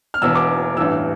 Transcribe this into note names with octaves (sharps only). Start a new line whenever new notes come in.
F6
E1 E2 B2 E6
D6
A1 G2 E3 E6